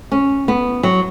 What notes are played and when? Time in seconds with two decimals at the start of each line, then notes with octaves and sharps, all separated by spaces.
0.12 C#4
0.48 B3
0.83 F#3